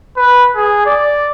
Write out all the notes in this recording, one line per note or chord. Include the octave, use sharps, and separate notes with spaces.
B4
G#4
D5